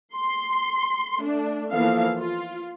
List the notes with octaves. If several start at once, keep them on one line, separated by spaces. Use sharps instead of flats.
C6
A3 D4
E3 F3 A#3 B3 A4 F5
F4